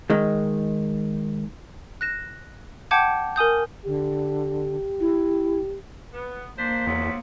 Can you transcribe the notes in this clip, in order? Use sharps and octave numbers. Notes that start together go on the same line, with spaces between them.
D#3 G#3
F#6 A#6 E7
F#5 G5 A5 D6 G6 G#6
A#4 G#5 D#6 G6
D3 G4
E4
B3
A#3 D4 C5 B6
E2 F3 F#3